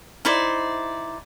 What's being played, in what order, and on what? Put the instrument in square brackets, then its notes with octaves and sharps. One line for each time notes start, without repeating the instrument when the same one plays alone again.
[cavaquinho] D#4 E4 C5 D5